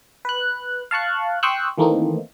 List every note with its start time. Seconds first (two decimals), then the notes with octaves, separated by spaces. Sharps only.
0.25 B4 F#6
0.91 F5 A5 C#6 F#6
1.43 G5 C6 C#6 D#6 E6 F#6
1.78 D#3 E3 A3 A#3 C4 D#4